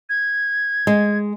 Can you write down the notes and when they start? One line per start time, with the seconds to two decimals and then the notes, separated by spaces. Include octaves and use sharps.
0.09 G#6
0.87 G#3